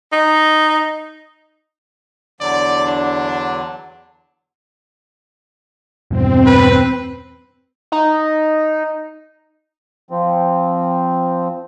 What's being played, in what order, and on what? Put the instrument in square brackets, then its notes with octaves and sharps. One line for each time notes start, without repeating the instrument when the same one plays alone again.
[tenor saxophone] D#4
[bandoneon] E2 D3 F#3 [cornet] D5
[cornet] D4
[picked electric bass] E2 G2 B2 [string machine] C4
[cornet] B4
[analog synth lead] D#4
[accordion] F3 C4